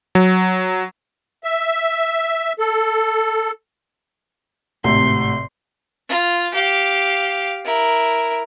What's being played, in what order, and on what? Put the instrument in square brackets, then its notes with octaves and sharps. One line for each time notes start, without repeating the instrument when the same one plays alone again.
[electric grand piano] F#3
[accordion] E5
A4
[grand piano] G#1 A2 C3 [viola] C6
[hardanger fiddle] F4
G4 F5
E4 A#4